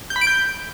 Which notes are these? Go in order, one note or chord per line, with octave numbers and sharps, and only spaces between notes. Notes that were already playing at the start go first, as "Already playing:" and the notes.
G6
B5
D7
G6